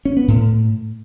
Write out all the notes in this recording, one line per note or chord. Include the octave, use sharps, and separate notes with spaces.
C#4
B3
A2